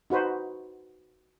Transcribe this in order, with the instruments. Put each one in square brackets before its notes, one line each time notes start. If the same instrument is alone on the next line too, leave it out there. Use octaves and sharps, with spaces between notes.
[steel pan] D#4 F#4 B4 C5